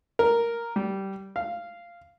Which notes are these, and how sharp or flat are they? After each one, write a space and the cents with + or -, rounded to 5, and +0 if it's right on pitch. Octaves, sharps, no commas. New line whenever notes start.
A#4 +0
G3 -15
F5 -10